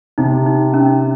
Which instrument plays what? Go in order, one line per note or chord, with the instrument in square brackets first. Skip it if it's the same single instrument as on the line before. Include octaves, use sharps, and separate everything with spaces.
[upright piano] C3 [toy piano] D#4
[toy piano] D#4
C#4